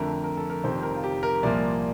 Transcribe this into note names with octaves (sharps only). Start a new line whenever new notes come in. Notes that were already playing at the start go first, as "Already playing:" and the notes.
Already playing: F2 D3 A3 A#4
A#4
A4
A#4
F1 F2 D#3 G3 C5
A#4
F4
G4
A#4
C2 A#2 F3 A#3 D5